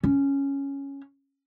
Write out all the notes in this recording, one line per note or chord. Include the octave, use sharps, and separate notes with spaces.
C#4